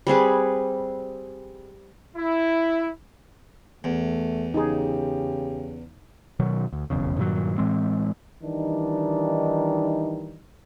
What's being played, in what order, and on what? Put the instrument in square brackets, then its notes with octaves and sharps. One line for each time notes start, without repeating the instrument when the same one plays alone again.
[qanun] G3 C4 G#4 B4
[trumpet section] E4
[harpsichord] E2 [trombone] A3
[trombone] C#3 [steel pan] D#4 G#4 [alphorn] G4
[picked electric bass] B2 D#3 F#3
D2
F1 B1 E2 C#3
G2 A#2 D#3 F#3
A2 E3 G#3 C4
[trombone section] D#3 E3 G3 D4 D#4